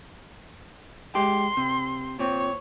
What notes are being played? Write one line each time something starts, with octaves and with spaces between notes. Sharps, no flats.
G#3 G4 C6
C3
A#2 C4 C#5